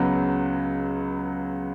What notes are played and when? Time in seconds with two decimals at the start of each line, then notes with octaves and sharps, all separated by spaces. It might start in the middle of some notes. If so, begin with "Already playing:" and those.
Already playing: C#2 C#3 F#3 B3